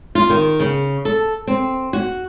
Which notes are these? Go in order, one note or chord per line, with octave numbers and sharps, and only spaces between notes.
F4
D#3
C#3
A4
C4
F#4